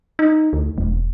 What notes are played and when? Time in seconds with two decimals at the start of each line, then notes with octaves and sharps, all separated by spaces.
0.19 D#4
0.53 D2
0.78 E1